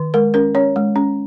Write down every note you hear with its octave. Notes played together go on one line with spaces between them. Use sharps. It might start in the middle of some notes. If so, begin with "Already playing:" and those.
Already playing: D#3
G#3 A#4
C#4 A#4
C#4 C#5
G#3
C#4